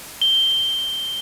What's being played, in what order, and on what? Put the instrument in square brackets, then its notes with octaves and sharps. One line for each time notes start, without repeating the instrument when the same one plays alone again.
[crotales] G7